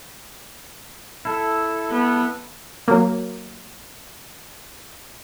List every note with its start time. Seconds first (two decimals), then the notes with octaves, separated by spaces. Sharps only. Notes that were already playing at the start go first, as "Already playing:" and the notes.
1.25 E4 A4
1.90 B3
2.88 F#3 A#3